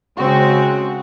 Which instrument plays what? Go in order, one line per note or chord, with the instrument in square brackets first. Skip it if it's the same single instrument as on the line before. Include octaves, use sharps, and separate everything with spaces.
[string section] C#3 G#3 C4 F#4